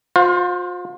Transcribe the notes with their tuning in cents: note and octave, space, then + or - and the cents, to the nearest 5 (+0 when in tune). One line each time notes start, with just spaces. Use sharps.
F4 +40 C5 +0 F5 +35